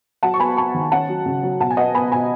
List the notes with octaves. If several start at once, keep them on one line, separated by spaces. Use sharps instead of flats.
F#3 F#5 A5
C#6
B3 G#5 B5
B3 A5 C#6
D#3
C#4 F#5 A5
F#3
C#3
F#3
B2 F#5 A5
G#5
B3 D#5 F#5
B3 G#5 B5
B2 G#5 B5